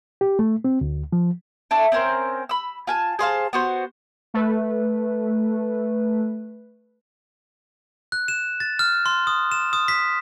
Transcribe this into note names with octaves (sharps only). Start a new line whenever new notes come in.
G4
A3
C4
D2
F3
D4 E4 A4
C4 C#4 A#4 C5
B5 E6
F4 G#5 A5
G#4 C5 F5 A5
B3 F#4 C5
A3 B4
F#6
E7
A6
F6
C6
D#6
E7
D#6
B6